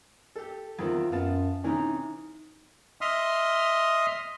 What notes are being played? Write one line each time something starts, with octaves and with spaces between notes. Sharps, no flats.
G4 A4
E2 D#3 C4 F4
F#2 B3 F4 A5
C3 E3 C#4 D#4
D#5 E5 C6 D#6 F6